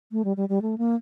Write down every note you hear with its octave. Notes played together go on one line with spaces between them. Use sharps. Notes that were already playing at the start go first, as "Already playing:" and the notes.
A3
G3
G3
G3
A3
A#3